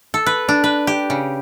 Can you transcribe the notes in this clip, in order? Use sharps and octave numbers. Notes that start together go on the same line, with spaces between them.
A4
B4
D4
B4
G4
C#3